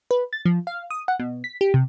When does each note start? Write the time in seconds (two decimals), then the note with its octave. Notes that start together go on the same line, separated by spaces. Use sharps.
0.11 B4
0.33 A6
0.45 F3
0.67 F5
0.90 D#6
1.08 F#5
1.20 B2
1.44 B6
1.61 G4
1.74 C3